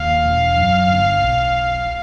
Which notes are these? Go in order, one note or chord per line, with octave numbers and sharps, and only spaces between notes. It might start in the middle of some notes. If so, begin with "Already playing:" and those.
Already playing: D#2 F5
E1
F#2
G1
B1